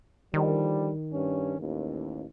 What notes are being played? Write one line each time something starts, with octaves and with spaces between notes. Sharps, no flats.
D3 D#3 F3 G3
G2 C#4
A1 D#2